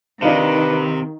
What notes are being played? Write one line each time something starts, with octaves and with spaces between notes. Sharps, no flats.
C3 D#3 D4 D#4 B4 F5